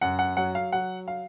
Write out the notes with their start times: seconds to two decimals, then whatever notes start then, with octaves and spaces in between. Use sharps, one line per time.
0.01 F#2 F#5
0.19 F#5
0.37 F#3 F#5
0.55 F5
0.72 F#3 F#5
1.08 F5